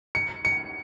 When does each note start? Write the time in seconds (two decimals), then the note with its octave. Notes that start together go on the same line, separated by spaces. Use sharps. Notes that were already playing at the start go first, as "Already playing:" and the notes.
0.15 C#7
0.45 C#7